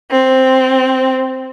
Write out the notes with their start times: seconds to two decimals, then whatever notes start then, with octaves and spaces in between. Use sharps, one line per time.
0.11 C4